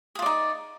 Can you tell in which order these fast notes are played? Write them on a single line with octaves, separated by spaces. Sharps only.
G#4 F4 D5 D#4